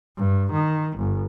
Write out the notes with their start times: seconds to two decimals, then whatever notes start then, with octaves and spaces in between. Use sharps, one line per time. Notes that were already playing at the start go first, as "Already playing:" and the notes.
0.17 G2
0.52 D#3
0.97 G1